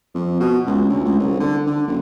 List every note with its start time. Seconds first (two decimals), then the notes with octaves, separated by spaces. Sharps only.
0.15 F2
0.40 B2
0.67 C#2
0.89 D2
1.05 C#2
1.19 C2
1.40 D3
1.67 D3
1.88 F#1